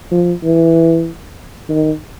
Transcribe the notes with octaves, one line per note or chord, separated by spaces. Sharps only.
F3
E3
D#3